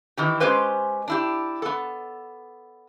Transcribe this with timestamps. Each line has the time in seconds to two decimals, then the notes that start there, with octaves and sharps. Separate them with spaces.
0.17 D#3 E3 G4
0.40 G#3 C#4 G4 B4 C5
1.08 D4 E4 G4
1.62 B3 A4